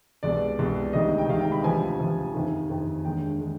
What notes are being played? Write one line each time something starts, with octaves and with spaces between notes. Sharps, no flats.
C2 B2 G#3 D5
C2 B2 G#3
D2 C3 D#3 G#3 D#5
G5
D2 C3 D#3 G#3 F5
G5
B5
D2 C3 F3 G#5
D2 C3 F3
F2 C3 D#3
F2 C3 D#3
D#2 D3 G#3 G5
D3 G#3